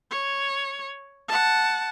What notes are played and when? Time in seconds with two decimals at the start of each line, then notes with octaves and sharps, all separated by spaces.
0.11 C#5
1.28 F#5 A5